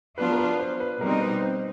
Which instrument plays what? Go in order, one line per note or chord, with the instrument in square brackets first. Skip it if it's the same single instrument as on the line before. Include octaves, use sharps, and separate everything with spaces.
[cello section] F#3 B3 D4 F4 [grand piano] B4
[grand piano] A#4
B4
C5
B4
[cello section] B2 G3 C4 D#4 [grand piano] A#4
[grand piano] B4
C5